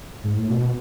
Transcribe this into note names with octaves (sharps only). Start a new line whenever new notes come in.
G#2
A2
B2